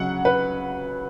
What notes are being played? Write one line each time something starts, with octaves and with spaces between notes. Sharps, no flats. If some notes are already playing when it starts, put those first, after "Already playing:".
Already playing: C#3 F#3 F#5
B4